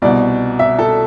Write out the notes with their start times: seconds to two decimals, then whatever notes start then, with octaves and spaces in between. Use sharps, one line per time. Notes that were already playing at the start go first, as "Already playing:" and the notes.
0.02 C2 B2 D5
0.59 E5
0.79 A4